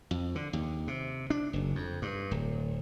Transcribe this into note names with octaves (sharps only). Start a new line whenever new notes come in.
F2
D3
D#2
C3
D4
F#1
F2
G2
D1